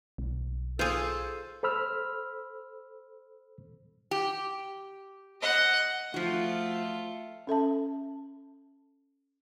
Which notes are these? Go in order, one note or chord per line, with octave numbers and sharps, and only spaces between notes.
B1
F4 G#4 A4 C5
A4 C5 B5 E6 F6
G4
D#5 F#5
F3 A3 F4 F#4
C#4 A4 E5 A5